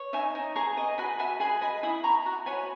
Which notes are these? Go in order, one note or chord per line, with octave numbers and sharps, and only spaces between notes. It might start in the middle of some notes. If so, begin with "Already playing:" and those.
Already playing: C#5
D#4 E5 G#5
D#4
G#4 A#5 C#6
D#5
F#4 G#5 B5
F#4 E5 G#5
G#4 G#5 B5
D#5 G#5 B5
E4 B5 D#6
E4 A#5 C#6
F#4
C#5 G#5 B5